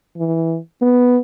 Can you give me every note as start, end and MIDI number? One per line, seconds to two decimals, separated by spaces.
0.17 0.57 52
0.82 1.18 59